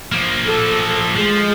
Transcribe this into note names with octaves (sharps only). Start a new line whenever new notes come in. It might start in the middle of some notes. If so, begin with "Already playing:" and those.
F3 A#3
A4
F3 G#3